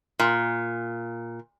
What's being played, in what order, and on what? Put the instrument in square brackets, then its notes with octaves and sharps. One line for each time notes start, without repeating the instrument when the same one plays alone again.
[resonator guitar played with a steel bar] A#2